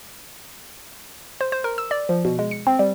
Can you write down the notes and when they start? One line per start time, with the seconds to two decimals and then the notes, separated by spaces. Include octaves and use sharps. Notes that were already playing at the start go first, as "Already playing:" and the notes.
1.41 C5
1.52 C5
1.64 A#4
1.78 E6
1.91 D5
2.09 F3
2.25 B2
2.39 G#3
2.51 C#7
2.67 C4
2.79 G3